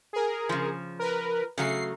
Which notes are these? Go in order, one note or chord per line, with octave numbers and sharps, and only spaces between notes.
G#4 A#4
C#3 F3
A#4 B4
C#3 F#3 A3 C7